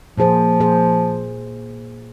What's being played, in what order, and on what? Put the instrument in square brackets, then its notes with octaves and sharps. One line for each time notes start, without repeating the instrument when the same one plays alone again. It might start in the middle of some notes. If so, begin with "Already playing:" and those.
[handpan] A#2 A#3 G#4 C5 [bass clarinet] F3
[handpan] A#2 A#3 G#4 C5